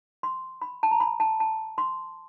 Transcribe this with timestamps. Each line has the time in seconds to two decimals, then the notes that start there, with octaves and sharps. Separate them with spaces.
0.23 C6
0.62 B5
0.83 A5
0.91 A#5
1.00 B5
1.20 A5
1.40 A5
1.78 C6